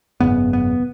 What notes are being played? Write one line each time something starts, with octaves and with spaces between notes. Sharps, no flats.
G#1 F#2 C#3 B3
B3